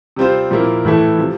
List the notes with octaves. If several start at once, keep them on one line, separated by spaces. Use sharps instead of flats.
C3 G3 C4 F4 C5
A#2 F3 A#3 E4
A2 E3 A3 E4 A4
C3 F3